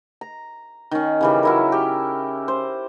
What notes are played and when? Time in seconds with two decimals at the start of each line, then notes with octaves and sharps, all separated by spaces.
0.21 A#5
0.91 D#3 C#4
1.21 C#3 E3 G3
1.43 F#3 E4 A#4
1.72 G4
2.48 C5